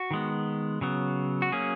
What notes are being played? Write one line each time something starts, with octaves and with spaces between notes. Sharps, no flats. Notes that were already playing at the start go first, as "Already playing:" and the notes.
Already playing: F#4
D#3 G#3 B3
C#3 F#3 B3
F#4
F#3 A#3 C#4 G#4